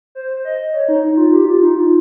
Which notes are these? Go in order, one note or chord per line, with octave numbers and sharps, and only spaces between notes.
C5
D#5
C#5
D#4
D#4
F4
G4
F4
D#4
F4